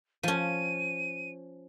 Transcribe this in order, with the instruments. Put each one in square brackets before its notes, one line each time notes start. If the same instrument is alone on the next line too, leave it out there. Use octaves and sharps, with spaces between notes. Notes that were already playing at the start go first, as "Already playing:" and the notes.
[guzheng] F3 C#4 [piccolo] D#7